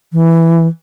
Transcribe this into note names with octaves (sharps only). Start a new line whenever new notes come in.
E3